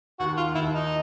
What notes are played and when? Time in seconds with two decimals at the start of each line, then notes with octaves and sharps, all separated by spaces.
0.20 D#2 F#4
0.37 F4
0.55 D#2 E4
0.72 D#4